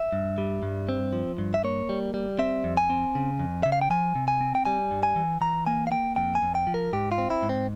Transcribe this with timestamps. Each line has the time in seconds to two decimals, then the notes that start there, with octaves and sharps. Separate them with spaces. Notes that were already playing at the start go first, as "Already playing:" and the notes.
Already playing: E5
0.12 G2
0.38 G3
0.63 G2
0.89 C4
1.13 F3
1.38 G2
1.54 E5
1.64 A#3 C#5
1.89 G3
2.14 G3
2.39 C4 E5
2.64 F2
2.77 G#5
2.90 C4
3.15 C#3
3.39 F2
3.63 C#3 E5
3.72 F5
3.82 G5
3.90 F3 G#5
4.15 C3
4.28 G#5
4.41 C4
4.55 G5
4.65 G3 G#5
4.91 G2
5.03 G#5
5.16 E3
5.41 E3 A#5
5.67 A#3 G#5
5.87 F5
5.91 A#3 G5
6.16 F2 G5
6.35 G#5
6.42 F2
6.55 G5
6.67 F3
6.74 A#4
6.93 G#2 G4
7.12 F4
7.18 C4
7.30 E4
7.43 G#2
7.49 C4